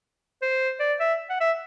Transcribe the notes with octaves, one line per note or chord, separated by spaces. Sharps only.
C5
D5
E5
F#5
E5